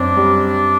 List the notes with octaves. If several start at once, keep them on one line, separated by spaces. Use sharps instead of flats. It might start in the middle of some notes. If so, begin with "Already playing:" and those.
Already playing: F#2 C4 D4
G3